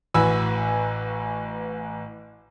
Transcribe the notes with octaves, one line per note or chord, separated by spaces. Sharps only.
A1 E3 F#4 G#5 B5 E6